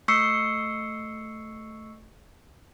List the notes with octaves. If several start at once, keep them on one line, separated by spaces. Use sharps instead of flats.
A3 C#6 E6 C7 C#7